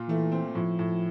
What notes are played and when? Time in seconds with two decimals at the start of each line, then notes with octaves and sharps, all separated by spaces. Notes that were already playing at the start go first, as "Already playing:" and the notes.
Already playing: A#2 F4
0.08 E3 A3
0.32 C4
0.55 A2 F3
0.79 A2